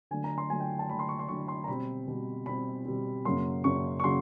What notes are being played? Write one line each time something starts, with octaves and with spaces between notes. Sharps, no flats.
D3 F#3 A3 G#5
A#5
C6
D3 F#3 A3 G#5
G5
A5
D3 F#3 A3 B5
C6
C#6
C6
D3 F#3 A3 C#6
C6
A#5
B2 G3 C4 B5
B2 G3 C4
B2 G3 C4 B5
B2 G3 C4
F#2 C#3 F#3 A#3 C6
F#2 C#3 F#3 A#3 C#6
C#6
C#3 F#3 A#3 C6